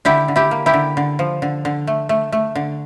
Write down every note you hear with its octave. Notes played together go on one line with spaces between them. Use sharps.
D3 E4 G4
D3
E4 G4
A#3
E4 G4
D3
D3
F3
D3
D3
A3
A3
A3
D3